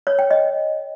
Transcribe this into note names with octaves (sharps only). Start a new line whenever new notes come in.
C#5
G5
D#5